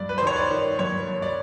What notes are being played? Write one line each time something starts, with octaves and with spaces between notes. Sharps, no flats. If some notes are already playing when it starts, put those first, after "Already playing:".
Already playing: G2 D5
B4
C5
D#3 C#5
D5
D#3
G2 C#5
G2
D5